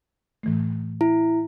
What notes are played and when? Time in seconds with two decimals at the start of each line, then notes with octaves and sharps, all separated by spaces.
0.43 A2 E3 A3
1.01 E4